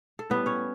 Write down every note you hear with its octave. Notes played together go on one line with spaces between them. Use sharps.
A4
A2 G3 B3 B4
C#4 C#5